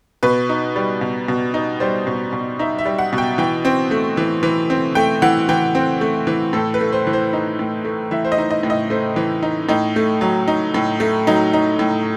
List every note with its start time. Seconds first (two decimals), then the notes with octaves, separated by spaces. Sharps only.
0.23 B2 B4
0.49 D#4
0.76 G3
1.01 B2
1.28 B2
1.54 D#4
1.80 G3 C5
2.07 B2
2.33 B2
2.59 D#4 E5
2.79 E5
2.86 G3
2.99 F#5
3.13 B2
3.18 G5
3.38 E3 G5
3.65 C4
3.91 A3
4.17 E3
4.43 E3
4.70 C4
4.95 A3 G5
5.22 E3 F#5
5.49 E3 G5
5.75 C4
6.01 A3
6.27 E3
6.53 A2 A4
6.74 B4
6.80 A3
6.92 C5
7.07 E3
7.13 C5
7.33 D#4
7.59 A2
7.85 A3
8.11 E3 E5
8.25 C5
8.32 D#5
8.38 D#4
8.51 D#5
8.63 A2
8.70 D#5
8.90 A3 C5
9.16 E3
9.43 D#4
9.69 A2 D#4
9.96 A3
10.21 F#3
10.48 D#4
10.74 A2
11.00 A3
11.27 F#3 D#4
11.53 D#4
11.79 A2